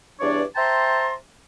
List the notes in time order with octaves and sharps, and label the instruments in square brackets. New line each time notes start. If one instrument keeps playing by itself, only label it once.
[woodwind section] E2 G2 D4 C#5 D5
C5 E5 G5 A5 A#5 C6